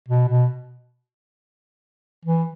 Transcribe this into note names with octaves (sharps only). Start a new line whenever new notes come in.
B2
B2
E3